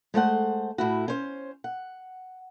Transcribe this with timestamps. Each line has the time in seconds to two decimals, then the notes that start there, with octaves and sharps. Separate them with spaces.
0.14 G#3 A3 C5 F#5
0.78 A2 E4 F#4
1.08 C#4 C5
1.64 F#5